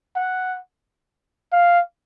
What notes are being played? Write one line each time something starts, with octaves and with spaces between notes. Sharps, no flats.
F#5
F5